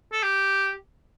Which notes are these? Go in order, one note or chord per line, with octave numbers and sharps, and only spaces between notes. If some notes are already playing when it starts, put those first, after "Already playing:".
A4
G4